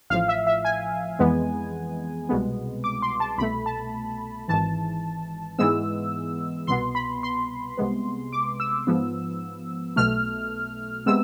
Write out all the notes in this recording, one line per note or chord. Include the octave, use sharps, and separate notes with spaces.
A1 A2 F3 F5
E5
E5
G#5
F2 E3 G#3 B3
C2 B2 G#3 B3
D6
C6
A5
C2 B2 A3 B5
A5
G#1 G#2 E3 A5
G#2 E3 G#3 B3 E6
C2 B2 B3 C6
B5
C6
C2 C3 G#3 B3
D6
E6
G#2 F3 B3
B1 B2 A3 F6
C3 G#3 B3 E6